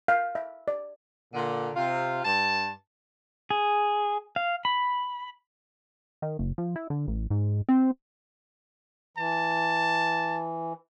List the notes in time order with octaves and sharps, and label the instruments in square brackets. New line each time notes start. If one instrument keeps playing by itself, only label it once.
[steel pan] F5
E5
D5
[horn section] A#2 D3
C3 F4
G2 A5
[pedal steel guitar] G#4
F5
B5
[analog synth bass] D#3
F#1
F3
E4
D3
A1
G#2
C4
[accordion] E3 [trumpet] A5